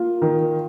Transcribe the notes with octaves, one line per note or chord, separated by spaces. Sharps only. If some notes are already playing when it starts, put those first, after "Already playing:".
Already playing: A#3 F4
D#3